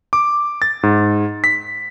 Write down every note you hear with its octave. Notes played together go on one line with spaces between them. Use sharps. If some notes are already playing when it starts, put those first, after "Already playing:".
D6
A6
G#2
B6